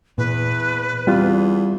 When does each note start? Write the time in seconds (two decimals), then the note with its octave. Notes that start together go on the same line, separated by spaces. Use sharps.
0.18 E2 A#2 B4
1.07 E2 G3 C4 F4